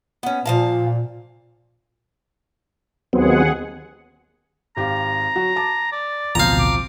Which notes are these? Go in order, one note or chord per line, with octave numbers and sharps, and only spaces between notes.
B3 C#4
A#2 F3 F5 A5
D#2 F#3 B3 C4 G#4 F#5
G#1 G4 F5 A#5
F#3 F#4
A5 D6
D5
A1 D2 B2 F3 C4 F5 A#5 G6
D6